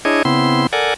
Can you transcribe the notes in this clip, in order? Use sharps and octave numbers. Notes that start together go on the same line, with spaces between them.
D4 E4 G#4 C#5 D#5
C#3 B3 C4 E4 C6
A4 A#4 D5 F#5 G#5